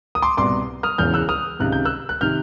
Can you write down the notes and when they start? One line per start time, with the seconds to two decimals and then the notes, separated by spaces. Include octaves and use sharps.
0.15 D#6
0.22 C6 D6
0.37 C2 B2 C6 D6
0.83 D#6 F6
0.98 E1 E2 C#3 E3 F6 G6
1.14 E6 F#6
1.29 D#6 F6
1.59 C#2 C3 D#3 F#6
1.72 G6
1.85 E6 F#6
2.09 F#6
2.21 C3 D#3 F6 G6